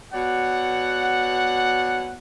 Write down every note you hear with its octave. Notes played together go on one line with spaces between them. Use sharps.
B2 C#5 D5 F#5